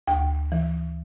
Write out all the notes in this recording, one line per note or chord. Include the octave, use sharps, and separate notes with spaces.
D2 G5
E3